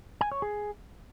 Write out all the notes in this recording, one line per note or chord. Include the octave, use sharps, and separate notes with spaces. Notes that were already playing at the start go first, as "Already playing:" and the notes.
G#5
C#5
G#4